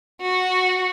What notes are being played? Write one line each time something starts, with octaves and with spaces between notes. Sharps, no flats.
F#4